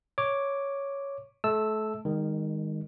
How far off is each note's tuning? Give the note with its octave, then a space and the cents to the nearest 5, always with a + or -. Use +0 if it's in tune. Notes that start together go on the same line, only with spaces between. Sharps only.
C#5 +0 D6 +0
A3 -30 A5 +0 E6 +0
D#3 +0 G#3 -35